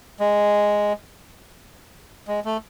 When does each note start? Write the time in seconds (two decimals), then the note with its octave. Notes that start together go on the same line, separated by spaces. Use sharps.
0.20 G#3
2.28 G#3
2.45 A3